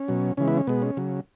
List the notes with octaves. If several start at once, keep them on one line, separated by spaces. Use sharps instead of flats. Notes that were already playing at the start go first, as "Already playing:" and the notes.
Already playing: C#4
B2 F#3
C#3 E3 G#3 C#4
B3 E4
C#4
B2 G#3 B3
C#4
C#3 F#3